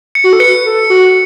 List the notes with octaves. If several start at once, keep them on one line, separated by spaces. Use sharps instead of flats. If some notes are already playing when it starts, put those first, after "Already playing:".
C#7
F#4
A4
B4 C#7
A4
F#4